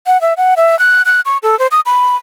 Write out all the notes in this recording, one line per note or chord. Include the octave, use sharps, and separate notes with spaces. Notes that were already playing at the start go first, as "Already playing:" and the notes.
F#5
E5
F#5
E5
F#6
F#6
C#6
A4
C5
D#6
B5